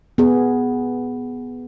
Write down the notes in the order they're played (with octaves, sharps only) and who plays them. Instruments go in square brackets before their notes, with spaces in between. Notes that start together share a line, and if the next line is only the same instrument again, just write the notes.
[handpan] B3 G#4